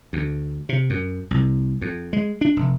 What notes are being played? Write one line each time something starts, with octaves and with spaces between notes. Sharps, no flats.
D2
C3
F#2
C2
F2
G#3
D4
F1